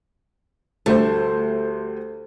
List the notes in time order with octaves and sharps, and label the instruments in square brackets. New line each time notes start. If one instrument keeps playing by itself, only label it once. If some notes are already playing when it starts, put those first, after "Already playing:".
[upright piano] D2 G3 C5 [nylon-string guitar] A3